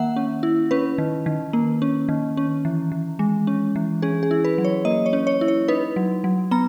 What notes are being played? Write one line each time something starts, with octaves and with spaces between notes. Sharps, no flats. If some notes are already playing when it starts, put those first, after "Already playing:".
Already playing: D#3 A#3 E5 F#5
C#4
E4
C#4 B4
D#3
D#3
A#3
C#4
D#3
C#4
E3
E3
G#3
C#4
E3
C#4 G#4
G#4
E4
B4
F#3
C#5
A#3 D#5
C#5
C#4
C#5
E4
C#5
D#4 B4
F#3
F#3
B3 A#5